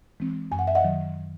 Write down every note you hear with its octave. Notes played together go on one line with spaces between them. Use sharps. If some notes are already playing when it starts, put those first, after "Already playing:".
E3 G#3 C4
F#2 G#5
F#5
E5
D#5 F#5
D#3 F#3